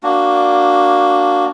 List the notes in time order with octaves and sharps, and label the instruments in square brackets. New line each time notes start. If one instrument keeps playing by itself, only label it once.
[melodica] A#3 D4 F#4